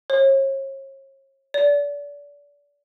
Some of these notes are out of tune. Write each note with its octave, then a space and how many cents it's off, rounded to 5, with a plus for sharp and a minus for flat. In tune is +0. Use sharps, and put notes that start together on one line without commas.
C#5 -40
D5 -30